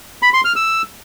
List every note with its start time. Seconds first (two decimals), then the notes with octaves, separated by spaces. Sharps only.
0.22 B5
0.34 C6
0.45 F6
0.56 E6